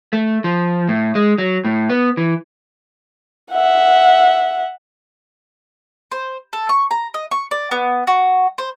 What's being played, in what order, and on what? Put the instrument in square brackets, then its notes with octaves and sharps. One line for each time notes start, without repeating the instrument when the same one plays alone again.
[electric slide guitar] A3
F3
A2
G#3
F#3
A2
B3
E3
[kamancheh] E5 F#5
[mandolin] C5
A4
C#6
A#5
D#5
C#6
D5
B3
F#4
C5